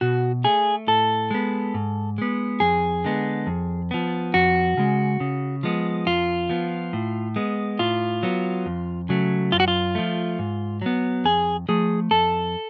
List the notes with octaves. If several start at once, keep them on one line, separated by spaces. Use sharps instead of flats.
B2 F#4
A3 G#4
A2 A4
G#3 B3
G#2
G#3 B3
F2 G#4
D3 G#3 B3
F2
F3 B3
F2 F#4
C#3 G#3
C#3
F3 G#3 B3
F2 F4
F3 B3
A2
G#3 B3
A2 F4
F#3 B3
F2
C#3 F#3 A3
F#2 F4
F#4
F4
F3 A3
G#2
F#3 B3
F2 G#4
F3 A3 G#4
F2 A4